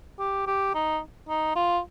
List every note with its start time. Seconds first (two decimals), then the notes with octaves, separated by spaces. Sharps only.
0.19 G4
0.47 G4
0.74 D#4
1.29 D#4
1.55 F4